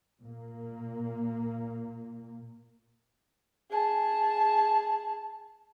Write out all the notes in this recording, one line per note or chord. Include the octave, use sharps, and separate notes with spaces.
A#2 A#3
G#4 A5